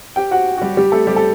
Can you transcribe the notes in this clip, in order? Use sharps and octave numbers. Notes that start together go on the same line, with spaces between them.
G4 G5
F#4 F#5
F#4
G3 G4
G3 G4
A3 A4
G3 G4
A4